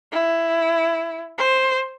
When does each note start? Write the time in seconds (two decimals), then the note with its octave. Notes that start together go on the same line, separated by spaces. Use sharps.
0.12 E4
1.38 C5